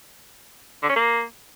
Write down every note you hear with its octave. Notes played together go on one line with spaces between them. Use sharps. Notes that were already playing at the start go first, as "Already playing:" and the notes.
D3
C#4
A#3